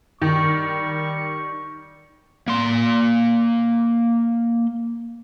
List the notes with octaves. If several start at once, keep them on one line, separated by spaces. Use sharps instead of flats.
D#3 G3 C#6
A#3 C6